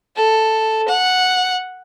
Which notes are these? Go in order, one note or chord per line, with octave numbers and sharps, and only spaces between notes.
A4
F#5